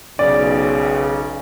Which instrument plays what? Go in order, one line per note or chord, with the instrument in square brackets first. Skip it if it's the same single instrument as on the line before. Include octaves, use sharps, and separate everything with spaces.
[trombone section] B1 C#3 [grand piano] D5